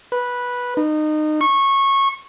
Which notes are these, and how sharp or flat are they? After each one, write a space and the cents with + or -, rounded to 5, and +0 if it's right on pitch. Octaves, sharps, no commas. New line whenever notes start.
B4 -10
D#4 -25
C#6 -20